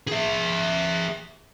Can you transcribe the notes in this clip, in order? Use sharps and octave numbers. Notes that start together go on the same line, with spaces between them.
G#4 E5